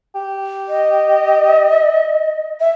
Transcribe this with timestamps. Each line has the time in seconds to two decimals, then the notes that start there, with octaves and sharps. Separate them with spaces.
0.15 G4
0.68 D#5
2.60 E5